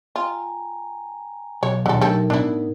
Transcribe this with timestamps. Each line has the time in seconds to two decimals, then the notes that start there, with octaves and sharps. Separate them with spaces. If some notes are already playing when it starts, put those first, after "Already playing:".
0.16 F4 G5 G#5 A#5
1.63 B1 C#5
1.86 D2 A#2 D3 D#3 D4 A4 C#5 E5
2.01 F#3 A3 D#4 G4 A4 A#4
2.30 A2 B3 D4 E4